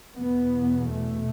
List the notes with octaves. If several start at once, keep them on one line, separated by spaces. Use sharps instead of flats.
E2 B2 B3
A3